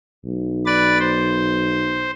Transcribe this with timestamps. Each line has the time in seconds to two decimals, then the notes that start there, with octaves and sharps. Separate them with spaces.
0.25 B1
0.66 B4 D5 A6
1.00 C5